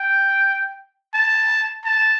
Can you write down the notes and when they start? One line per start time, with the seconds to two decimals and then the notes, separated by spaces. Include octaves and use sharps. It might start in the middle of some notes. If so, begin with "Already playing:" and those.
Already playing: G5
1.14 A5
1.84 A5